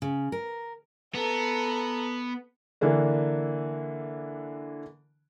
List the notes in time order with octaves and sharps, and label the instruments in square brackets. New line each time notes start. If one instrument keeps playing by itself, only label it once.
[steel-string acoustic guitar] C#3
A#4
[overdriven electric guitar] B3 [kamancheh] A4 A#5
[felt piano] D3 E3 A#3 D4